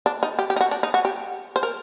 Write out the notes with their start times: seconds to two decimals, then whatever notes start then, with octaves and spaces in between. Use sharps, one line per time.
0.06 D4
0.23 D#4
0.39 G4
0.50 G4
0.56 D#4
0.61 F#4
0.71 D4
0.83 D#4
0.94 F#4
1.05 G4
1.56 C5
1.63 A#4